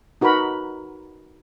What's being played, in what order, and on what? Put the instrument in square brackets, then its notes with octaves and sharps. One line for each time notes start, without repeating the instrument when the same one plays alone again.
[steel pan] D#4 F#4 A#4 B4 B5